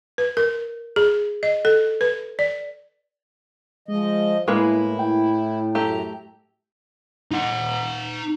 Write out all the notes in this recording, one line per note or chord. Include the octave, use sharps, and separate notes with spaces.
B4
A#4
G#4
D#5
A4
B4
D5
F3 G#3 D#5
A2 G#3 A#3 E4 B4
G5
F#2 A3 G4 A#5
D#4 F#5